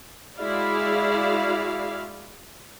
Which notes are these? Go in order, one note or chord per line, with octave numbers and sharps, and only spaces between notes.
G#3 E4 F#4 G#4 D5 F5